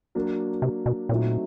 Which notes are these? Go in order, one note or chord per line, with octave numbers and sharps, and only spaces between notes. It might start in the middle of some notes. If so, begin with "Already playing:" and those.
F#3 A#3 D4
C3
B2
A#2 F#3 A3 C4 D#4